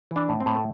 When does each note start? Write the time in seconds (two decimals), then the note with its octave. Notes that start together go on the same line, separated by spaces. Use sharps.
0.11 E3 D4
0.29 A2
0.40 C4
0.46 A2
0.55 A3